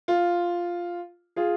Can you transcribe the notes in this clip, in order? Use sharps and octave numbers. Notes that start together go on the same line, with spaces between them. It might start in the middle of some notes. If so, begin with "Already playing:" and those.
F4
F4 G#4